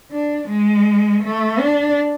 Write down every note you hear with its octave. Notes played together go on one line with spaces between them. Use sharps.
D4
G#3
A3
D4